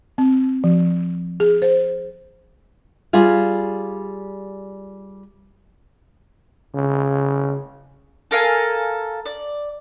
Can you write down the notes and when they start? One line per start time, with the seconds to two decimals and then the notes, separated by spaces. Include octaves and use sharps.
0.18 C4
0.64 F3
1.40 G#4
1.62 C5
3.13 G3 F4 G#4 F5
6.74 C#3
8.31 A4 A#4 F5 G#5
9.25 D5